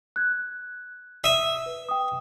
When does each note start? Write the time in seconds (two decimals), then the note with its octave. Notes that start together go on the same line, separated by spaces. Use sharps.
0.16 F#6 G#6
1.24 E5 D#6 D#7
1.66 B4
1.89 G5 D#6